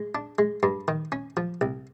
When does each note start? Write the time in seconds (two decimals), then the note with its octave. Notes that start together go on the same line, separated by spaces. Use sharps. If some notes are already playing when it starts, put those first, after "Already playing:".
Already playing: G#3
0.15 D4
0.39 G#3
0.63 G2
0.88 D#3
1.12 C#4
1.37 F3
1.61 C2